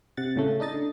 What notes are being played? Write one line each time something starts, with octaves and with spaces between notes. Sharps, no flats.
C3 F#5 A6
A2 C#3 A3
D4 D#4 D#5 A6
D3